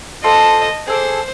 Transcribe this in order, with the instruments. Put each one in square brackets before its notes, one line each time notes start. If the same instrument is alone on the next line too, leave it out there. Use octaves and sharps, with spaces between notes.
[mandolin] F4 A4 C5 [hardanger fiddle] D#5 A5
[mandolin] G#4 A4 D6 [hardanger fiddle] C5